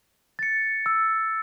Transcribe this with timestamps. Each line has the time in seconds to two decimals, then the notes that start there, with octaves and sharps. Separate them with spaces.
0.39 A6 C#7
0.86 E6